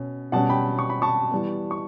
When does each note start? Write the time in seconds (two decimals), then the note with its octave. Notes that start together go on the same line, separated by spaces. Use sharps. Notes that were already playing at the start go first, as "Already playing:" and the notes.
Already playing: B2 C#4
0.32 B2 G3 C#4 F#5 A5
0.50 G5 B5
0.79 C#6
0.90 B5
1.02 A5 C#6
1.31 E3 G3 B3
1.71 C#6